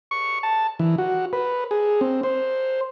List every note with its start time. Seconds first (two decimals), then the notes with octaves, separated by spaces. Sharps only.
0.11 C#6
0.43 A5
0.79 E3
0.98 F#4
1.33 B4
1.71 G#4
2.01 C4
2.23 C5